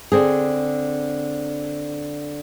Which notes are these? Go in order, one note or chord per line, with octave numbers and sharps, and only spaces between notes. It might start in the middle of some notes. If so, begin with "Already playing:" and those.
D3 C4 G#4